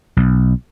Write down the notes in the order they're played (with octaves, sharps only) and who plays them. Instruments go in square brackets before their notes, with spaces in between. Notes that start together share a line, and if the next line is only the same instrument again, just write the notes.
[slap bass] B1